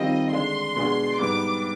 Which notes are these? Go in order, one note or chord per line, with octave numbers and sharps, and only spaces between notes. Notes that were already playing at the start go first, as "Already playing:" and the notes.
Already playing: D#3 G3 C4 F4 D#5
D3 G#3 D4 C6
B2 G#3 D4 G#4
G#2 G3 B3 D6